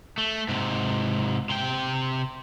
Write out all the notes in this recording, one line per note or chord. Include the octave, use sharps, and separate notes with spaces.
A3
G#2 C3
C3 G5